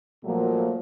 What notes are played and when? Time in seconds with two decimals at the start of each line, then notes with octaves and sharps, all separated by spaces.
0.24 A#2 F3 F#3 A3 A#3